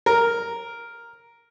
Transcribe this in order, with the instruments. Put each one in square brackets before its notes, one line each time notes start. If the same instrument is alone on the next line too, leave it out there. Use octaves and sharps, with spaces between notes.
[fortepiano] A#4